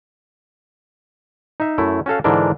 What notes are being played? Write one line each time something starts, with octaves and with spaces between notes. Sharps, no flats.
D#4 E5
F#2 A3 E4
C#4 F#4 A4 F5
G#2 D3 E3 D4 A#4